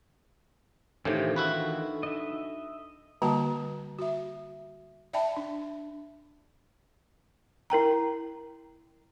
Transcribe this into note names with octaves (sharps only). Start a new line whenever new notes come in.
A2 C3 D#3 E3 D4 D#4 F4 A4
E4 F#4 B4
D#5 E5
D3 G3 A#3 F#4 G5 A5
F#4 E5
D5 E5 G5 A5 B5
D4
E4 A#4 G5 A#5